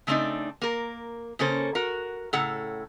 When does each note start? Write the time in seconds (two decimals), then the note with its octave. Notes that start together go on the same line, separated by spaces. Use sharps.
0.07 C#3 A3 C4 D4 D#4
0.62 A#3 A#4
1.39 C#3 A#3 C#4 A4 C5
1.75 F#4 A#4
2.33 A2 C#3 A4 F#5 A#5